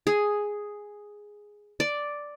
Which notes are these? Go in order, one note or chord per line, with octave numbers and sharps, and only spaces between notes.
G#4
D5